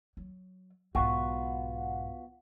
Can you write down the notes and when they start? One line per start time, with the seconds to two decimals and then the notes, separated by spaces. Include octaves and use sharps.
0.17 F#3
0.95 B1 G#2 B3 F4 F#4